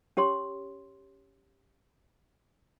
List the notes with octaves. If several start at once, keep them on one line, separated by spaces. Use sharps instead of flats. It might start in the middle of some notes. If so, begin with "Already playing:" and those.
C#4 G4 C#5 C6